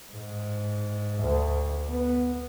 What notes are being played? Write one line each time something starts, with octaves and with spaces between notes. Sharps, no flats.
G#2
D2
B3